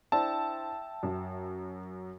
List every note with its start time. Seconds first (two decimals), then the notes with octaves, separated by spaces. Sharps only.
0.12 D4 E4 C5 E5 G5 A5 E6
1.03 F#2